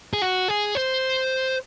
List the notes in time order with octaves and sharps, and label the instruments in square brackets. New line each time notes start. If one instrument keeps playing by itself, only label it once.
[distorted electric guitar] G#4
F#4
G#4
C5